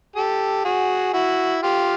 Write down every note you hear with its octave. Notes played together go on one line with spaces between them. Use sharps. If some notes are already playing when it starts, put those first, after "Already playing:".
G4 A4
F#4 G#4
E4 F#4
F4 G4